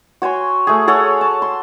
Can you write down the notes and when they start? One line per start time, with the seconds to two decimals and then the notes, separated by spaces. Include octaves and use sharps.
0.22 F#4 C#5 G#5 C6
0.67 A3 G#4
0.87 G#4 A4 C#5 F#5
1.21 A5
1.42 C6